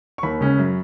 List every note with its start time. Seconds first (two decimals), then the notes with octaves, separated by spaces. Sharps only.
0.18 C#6
0.23 D#2 B5
0.41 C#3 G#3 C#4
0.58 F#2